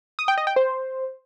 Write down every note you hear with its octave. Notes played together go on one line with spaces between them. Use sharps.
D#6
G5
D#5
G5
C5